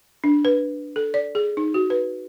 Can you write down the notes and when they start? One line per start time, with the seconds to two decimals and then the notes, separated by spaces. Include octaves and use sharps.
0.24 D4
0.45 B4
0.96 A4
1.14 D5
1.35 G#4
1.57 D#4
1.74 F#4
1.90 B4